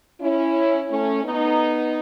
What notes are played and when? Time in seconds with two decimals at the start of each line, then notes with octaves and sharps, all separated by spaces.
0.21 C#4 E4
0.90 A3 C#4
1.24 B3 D#4